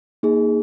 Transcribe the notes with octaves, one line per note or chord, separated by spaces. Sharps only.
A#3 D#4 G#4